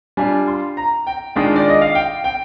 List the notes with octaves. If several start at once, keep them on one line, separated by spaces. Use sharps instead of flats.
G3 D4 F4 G#5
C6
A#5
G5
D#3 G#3 D4 F4
D5
D#5
F5
G5
G5